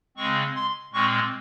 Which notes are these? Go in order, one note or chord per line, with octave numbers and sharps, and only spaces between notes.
C#3 G#3 C4 C#6
C6
A#2 G#3 C4 C#6